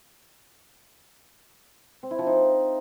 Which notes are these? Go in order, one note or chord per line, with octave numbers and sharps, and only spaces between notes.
C4
E4
F3
D#4